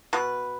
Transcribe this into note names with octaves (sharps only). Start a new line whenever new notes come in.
B2 B4